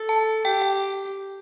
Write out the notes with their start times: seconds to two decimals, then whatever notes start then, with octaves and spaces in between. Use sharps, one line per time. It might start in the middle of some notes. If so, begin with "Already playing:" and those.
Already playing: A4
0.09 A5
0.45 G4 G5
0.62 G5